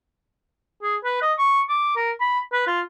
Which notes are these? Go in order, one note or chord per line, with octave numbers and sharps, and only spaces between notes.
G#4
B4
D#5
C#6
D6
A#4
B5
B4
F4